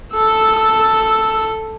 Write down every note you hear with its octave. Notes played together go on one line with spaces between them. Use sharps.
A4 E6